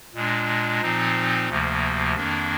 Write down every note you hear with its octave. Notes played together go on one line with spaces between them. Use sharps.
A#2 G#3 D4
A#2 F3 C4 D#4
D2 C3 F3 A#3
F2 D#3 A#3 D4